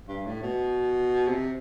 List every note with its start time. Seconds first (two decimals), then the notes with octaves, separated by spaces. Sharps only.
0.08 G2
0.26 A2
0.43 B2
1.28 C3